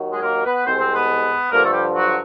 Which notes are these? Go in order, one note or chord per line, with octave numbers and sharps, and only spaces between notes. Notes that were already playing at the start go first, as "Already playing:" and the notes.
Already playing: D#2 D#3 F#3
G#3 G#4
A#3 A#4
B3 B4
C2 B2 G#3 C4 C5
C4 C5
B3 B4
G2 D3 F3 A3 A#3 A#4
A3 A4
G3 G4
F#3 F#4